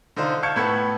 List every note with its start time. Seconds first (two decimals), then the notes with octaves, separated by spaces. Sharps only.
0.16 D3 D#4 F4 C5
0.43 F5 A5 C#6 G6 G#6 C#7
0.56 A2 B3 A4 B5 G#6 C#7